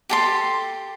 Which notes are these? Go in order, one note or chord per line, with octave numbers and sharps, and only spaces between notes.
G4 A4 C6